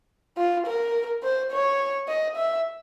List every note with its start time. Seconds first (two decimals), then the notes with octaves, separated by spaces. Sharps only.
0.38 F4
0.67 A#4
1.23 C5
1.52 C#5
2.08 D#5
2.36 E5